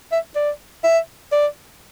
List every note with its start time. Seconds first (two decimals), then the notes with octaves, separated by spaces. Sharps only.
0.12 E5
0.36 D5
0.84 E5
1.32 D5